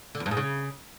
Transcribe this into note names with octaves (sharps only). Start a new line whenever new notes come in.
D3
E2
G2
G#2
C#3